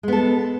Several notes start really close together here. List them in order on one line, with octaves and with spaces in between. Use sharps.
G#3 B3 A4